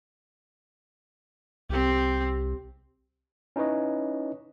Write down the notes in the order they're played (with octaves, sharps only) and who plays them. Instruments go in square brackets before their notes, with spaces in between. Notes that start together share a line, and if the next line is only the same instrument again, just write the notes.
[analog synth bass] C2 [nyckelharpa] C4 G4
[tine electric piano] C#4 D#4 E4 B4 C#5 D#5